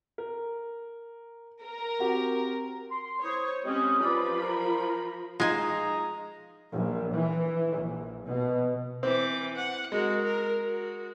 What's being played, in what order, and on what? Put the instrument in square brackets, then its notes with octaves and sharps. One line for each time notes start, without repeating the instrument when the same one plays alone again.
[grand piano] A#4
[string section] A#4
[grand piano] C4 F#4 G4
[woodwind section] C6
[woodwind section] E4 C5 D#6 [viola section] C#5
[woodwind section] G#3 G4 D#5 [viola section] C4 C#4
[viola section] F3 B5 [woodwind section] G4 B4 D5
[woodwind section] A#4
[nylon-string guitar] F3 D#4 F4 [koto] G#3 G#5 [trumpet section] D#5 A#5
[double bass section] A#1
E3
A#1
B2
[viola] E3 D6 [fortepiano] C4
[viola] F#5
[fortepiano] G#3 [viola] F#4 A#4
[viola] A#4
F#4